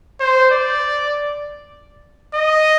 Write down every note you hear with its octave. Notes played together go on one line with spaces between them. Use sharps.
C5
D5
D#5